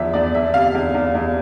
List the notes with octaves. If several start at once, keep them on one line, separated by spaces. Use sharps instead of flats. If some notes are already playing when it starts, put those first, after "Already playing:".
Already playing: E2 F3 E5
E2 D5
E2 E5
C3 F5
E2
E2
E2